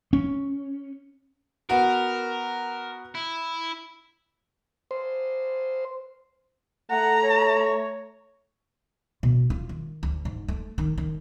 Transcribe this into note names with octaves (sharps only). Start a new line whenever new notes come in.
C#4
B3 F#4 A#4
E4
C5
A3 F#5 A#5
C#5
B2
F4
D#3
D2
G#2
A3
D#3
D#3